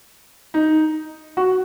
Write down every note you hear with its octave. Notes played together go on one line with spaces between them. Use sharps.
D#4
F#4